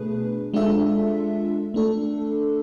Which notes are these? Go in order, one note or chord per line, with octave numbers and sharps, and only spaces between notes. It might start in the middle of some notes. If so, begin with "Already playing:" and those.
Already playing: B2 A3 D4 G#4 B4
G#3 D4 F4 A4 E5
A3 D4 A4